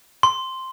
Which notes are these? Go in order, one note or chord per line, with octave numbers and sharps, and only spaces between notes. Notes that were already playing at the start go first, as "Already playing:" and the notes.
C6